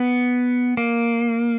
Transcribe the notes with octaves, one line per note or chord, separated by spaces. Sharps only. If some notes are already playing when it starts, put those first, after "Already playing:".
Already playing: B3
A#3